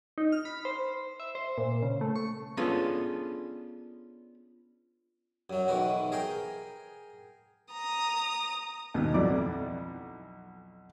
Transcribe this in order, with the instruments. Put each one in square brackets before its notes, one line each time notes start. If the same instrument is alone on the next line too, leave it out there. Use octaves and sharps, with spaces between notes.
[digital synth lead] D#4
F6
B5
C5
E5
C5
A#2
C#3
A3
C#6
[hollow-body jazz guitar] B3 C#4 D4 F4 G#4 A4
[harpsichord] F#2 F#3
B1 D#3 E3 F#4
G#4 A#4 G5
[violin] A#5 D#6
[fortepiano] D#2 B2
B1 F2 E4 D5 D6